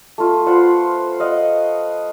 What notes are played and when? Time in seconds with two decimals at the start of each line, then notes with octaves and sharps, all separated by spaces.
0.18 A3 F4
0.46 F4 B4 C5 F#5
1.19 D#5 F5 F#5